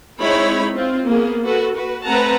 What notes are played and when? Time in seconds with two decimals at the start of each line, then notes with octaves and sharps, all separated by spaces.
0.20 G#3 C4 D#4 E4 C#5 B5
0.75 C4 F4
1.06 A#3 B3 G#4
1.44 F#4 A4 B4
1.73 F#4 B4
2.06 A3 C4 B4 F#5 A5 A#5